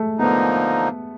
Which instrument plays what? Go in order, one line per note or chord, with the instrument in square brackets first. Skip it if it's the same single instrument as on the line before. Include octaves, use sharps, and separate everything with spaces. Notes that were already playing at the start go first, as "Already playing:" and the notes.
Already playing: [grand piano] G#3 A3
[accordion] D3 F3 A#3 D#4 [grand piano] B3